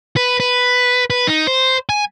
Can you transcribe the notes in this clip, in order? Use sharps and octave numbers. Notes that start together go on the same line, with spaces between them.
B4
B4
B4
D#4
C5
G#5